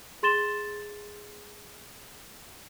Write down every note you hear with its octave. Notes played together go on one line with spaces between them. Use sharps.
G#4 C6 A6 E7 G7